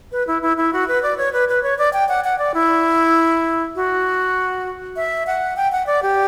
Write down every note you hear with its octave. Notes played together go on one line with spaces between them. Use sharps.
B4
E4
E4
E4
F#4
B4
D5
C#5
B4
B4
C#5
D5
G5
F#5
F#5
D5
E4
F#4
E5
F#5
G5
F#5
D5
G4